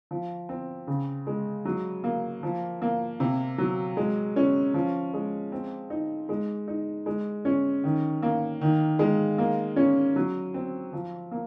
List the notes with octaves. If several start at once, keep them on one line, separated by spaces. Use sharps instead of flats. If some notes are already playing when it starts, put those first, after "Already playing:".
F3
C4
C#3
G#3
F#3
A#3
F3
A#3
C3
F#3
G#3
C#4
F3
G#3
C4
D#4
G#3
D#4
G#3
C#4
D#3
A#3
D#3
G#3
A#3
C#4
F#3
C4
F3
A#3